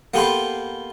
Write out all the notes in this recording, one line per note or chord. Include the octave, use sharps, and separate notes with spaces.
A#3 B3 G4 A4 B4 C5